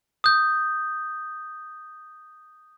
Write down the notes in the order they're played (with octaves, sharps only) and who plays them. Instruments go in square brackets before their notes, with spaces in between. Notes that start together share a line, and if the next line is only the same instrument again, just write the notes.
[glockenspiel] D#6 G6